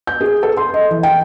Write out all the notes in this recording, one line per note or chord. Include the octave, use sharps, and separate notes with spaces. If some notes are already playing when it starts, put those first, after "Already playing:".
G6
G#4
A4
C6
D#5
E3
G5